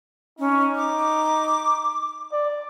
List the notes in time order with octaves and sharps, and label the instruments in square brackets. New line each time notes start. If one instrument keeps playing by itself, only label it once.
[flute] C#4 [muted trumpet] D#4
[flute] D6
[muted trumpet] D5